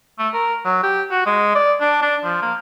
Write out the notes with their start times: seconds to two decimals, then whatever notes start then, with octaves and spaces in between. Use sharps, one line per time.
0.19 A3
0.34 A#4
0.65 F#3
0.83 G4
1.11 F#4
1.26 G#3
1.55 D5
1.81 D4
2.02 D4
2.24 F3
2.42 A#3